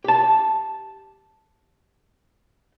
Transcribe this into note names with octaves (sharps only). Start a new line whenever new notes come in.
G4 A5